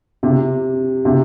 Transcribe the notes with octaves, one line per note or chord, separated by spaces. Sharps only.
C3
C3